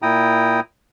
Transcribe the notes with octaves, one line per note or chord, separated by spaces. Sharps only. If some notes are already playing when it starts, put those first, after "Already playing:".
A#2 E4 G5 A#5 D#6